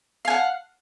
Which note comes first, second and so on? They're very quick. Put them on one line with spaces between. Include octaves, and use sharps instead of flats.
F5 G#5 F#5